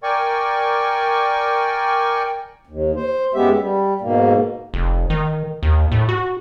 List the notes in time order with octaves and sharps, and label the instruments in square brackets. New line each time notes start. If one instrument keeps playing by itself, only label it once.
[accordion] A#4 D5 G5 G#5 C#6
[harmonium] D#2
C5
F#2 G#3 B3 G4 E5
G3
G#2 B2 A#3
[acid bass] F1
D#3
D#2
A2
F#4